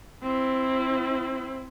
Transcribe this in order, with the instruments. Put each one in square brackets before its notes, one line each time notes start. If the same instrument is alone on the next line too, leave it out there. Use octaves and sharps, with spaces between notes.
[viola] C4 E4